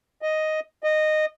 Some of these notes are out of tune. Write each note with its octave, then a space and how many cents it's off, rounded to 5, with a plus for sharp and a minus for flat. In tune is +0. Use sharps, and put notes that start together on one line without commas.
D#5 +0
D#5 -15